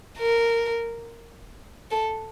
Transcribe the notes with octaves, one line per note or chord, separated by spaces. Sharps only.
A#4
A4